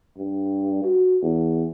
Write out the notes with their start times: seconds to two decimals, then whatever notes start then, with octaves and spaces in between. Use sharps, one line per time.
0.18 G2
0.84 F#4
1.22 E2